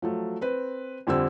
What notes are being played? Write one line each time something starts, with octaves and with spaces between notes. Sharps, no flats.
F3 F#3 A3
C4 B4
F2 D3 G3 C4 E6